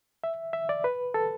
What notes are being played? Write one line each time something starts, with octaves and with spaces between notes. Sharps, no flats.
E5
E5
D5
B4
A4